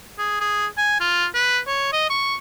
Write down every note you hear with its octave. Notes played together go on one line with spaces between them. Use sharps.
G#4
G#4
G#5
F4
B4
C#5
D#5
C#6